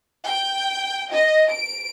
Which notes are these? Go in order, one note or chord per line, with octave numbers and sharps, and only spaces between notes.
G5
D#5
D7